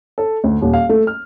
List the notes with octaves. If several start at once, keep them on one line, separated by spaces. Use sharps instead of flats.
A4
D2
D#1
F5
A3
F6